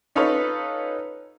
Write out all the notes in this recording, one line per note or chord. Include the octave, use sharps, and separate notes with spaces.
C#4 D#4 F4 A4 B4 C#5